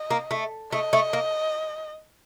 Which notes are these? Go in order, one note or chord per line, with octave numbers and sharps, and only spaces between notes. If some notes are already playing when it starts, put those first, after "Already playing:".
Already playing: D#5
A#3
A3
A3 D#5
A3
A#3